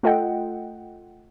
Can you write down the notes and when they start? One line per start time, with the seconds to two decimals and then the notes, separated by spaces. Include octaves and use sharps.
0.03 A3 F4 A4 D#5 F#5 G5